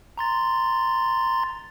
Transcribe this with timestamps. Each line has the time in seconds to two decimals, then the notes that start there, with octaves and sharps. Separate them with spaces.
0.18 A#5 C6 A6